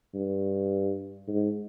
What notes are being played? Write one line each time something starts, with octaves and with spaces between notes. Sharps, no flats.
G2
G#2